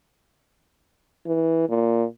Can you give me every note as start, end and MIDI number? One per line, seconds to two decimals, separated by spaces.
1.26 1.67 52
1.69 2.04 46